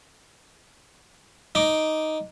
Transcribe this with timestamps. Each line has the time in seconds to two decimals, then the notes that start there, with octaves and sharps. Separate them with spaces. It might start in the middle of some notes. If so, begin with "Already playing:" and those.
1.55 D#4 D6